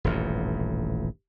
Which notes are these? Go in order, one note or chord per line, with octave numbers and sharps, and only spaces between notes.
D#1 A1 G2